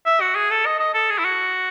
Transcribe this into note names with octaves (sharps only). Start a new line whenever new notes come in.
E5
F#4
G#4
A4
D#5
D#5
A4
G#4
E4
F#4